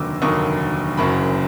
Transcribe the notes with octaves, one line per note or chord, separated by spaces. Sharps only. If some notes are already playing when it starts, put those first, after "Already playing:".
Already playing: F1 D#2 D3 F#3 A#3 D6 E6
F1 D#2 D3 F#3 A#3 C#6 D#6
F#1 F#2 C#3 F#3 B5 C#6